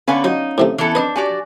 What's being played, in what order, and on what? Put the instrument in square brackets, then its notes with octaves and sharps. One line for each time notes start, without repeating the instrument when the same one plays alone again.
[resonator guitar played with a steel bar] D3 B3 B4 [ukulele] C#4 F5 G#5
[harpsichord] F#3 [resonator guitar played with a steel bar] D#4
[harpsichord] A2 C3 A3
[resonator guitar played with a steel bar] E3 B3 A4
[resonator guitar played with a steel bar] C4 D4 [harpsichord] B4 D#5
[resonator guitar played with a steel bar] F#4 G4 D5 [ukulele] G#5